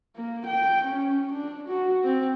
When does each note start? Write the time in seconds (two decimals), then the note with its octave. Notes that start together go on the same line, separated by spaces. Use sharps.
0.16 A#3
0.46 G5
0.84 C#4
1.32 D4
1.68 F#4
2.04 C4